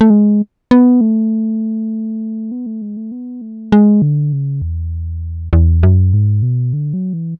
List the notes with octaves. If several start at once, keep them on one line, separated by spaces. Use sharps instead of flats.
A3
G#3
B3
A3
B3
A3
G#3
A3
B3
A3
G#3
D3
C#3
E2
E2
F#2
G#2
B2
D3
F#3
E3